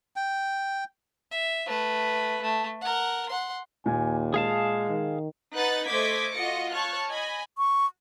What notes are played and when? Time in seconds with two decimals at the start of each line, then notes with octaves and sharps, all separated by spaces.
0.16 G5
1.31 E5
1.67 A3 B4
2.42 A3
2.81 A#4 F#5
3.29 F#5 C6
3.86 D#2 A#2 G#5
4.34 G#3 G#4 F5 A5
4.89 D#3
5.55 D#4 B4 F#5 F#6 A6
5.87 A3 C5 D#5 D6 G#6 B6
6.34 F4 F#4 D#5 A#6 C#7
6.72 C#5 A5 C#6 F6 F#6
7.10 D#5 G#5 B5
7.58 C#6